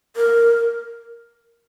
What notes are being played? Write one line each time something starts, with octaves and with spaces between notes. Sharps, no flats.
A#4